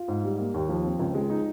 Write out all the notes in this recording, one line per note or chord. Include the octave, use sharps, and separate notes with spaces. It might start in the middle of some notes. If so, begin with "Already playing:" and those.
Already playing: F4
G#2
G3
A#3
D#2
F3
C4
C#2
G#3
D#4